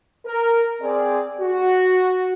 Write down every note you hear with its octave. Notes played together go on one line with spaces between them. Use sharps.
A#4
C4 G#4 D5
F#4